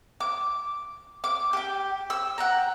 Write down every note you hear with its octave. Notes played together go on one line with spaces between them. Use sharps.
D6
D6
G4 G5
E6
F#5 G5 A#5